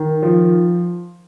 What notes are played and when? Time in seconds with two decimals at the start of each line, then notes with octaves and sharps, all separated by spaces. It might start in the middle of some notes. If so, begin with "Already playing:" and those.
Already playing: D#3
0.22 F3